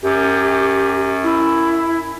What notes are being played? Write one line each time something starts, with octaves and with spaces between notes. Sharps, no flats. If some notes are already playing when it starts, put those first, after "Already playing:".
F#2 G4
E4